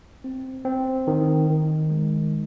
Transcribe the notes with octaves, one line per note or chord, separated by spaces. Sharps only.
C4
C4
D#3
D#3
G#3